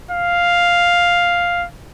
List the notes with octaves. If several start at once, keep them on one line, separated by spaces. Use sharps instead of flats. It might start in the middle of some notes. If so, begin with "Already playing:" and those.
F5